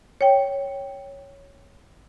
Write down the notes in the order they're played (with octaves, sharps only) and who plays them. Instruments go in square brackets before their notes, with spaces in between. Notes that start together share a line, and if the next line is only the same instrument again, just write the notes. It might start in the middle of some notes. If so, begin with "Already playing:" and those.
[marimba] C#5 G5